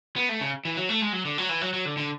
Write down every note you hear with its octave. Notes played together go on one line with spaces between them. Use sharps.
B3
A3
C#3
E3
F#3
A3
G#3
F#3
D3
F#3
E3
F#3
F#3
D3
D3